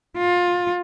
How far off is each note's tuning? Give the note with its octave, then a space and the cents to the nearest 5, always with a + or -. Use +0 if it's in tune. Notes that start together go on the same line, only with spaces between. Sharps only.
F4 +25